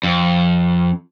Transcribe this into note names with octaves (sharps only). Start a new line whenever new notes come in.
F2